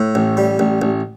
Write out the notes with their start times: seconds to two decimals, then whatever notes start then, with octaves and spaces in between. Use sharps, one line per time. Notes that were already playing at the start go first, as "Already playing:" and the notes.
Already playing: A2
0.15 A1
0.37 G3
0.59 A1
0.82 A1